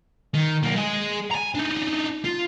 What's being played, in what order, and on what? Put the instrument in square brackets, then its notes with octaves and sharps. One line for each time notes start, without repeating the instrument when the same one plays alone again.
[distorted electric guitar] D#3
B1 A#3
G#3 G#4
G#5 A#5
D4 D#4
F4